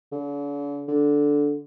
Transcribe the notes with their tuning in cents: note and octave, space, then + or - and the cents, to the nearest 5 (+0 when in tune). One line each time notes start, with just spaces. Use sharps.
D3 -45
D3 -10